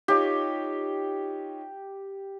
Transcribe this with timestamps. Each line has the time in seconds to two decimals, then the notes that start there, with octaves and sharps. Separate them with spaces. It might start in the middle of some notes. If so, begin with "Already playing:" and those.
0.08 D#4 F4 G4 C#5